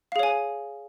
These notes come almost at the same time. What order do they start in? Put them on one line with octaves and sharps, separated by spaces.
F5 G#4 C#5 G#5